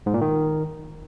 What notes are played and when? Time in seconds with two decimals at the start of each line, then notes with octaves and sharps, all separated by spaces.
0.06 G#2
0.14 A#2
0.21 D#3